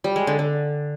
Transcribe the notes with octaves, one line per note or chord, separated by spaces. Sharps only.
G3
G#3
D3
D3